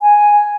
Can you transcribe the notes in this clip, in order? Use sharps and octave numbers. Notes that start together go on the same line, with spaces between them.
G#5